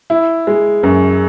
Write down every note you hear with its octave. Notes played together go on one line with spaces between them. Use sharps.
E4
G#3
F#2